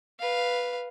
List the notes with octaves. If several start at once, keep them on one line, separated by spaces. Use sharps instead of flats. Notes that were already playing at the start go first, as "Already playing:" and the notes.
B4 F5